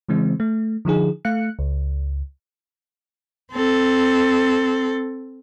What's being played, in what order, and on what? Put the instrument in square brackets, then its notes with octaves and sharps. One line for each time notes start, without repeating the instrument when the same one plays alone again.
[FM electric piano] C#3 E3 G#3 C4
A3
D3 F3 D#4 G#4
A3 F5 F#6 C#7
C#2
[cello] C4 A4